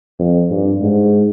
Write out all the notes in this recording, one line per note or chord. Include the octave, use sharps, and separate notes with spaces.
F2
G2
G#2